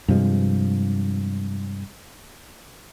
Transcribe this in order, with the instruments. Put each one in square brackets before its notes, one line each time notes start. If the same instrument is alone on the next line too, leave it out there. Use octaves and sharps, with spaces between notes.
[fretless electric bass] G2 C3 F3 G#3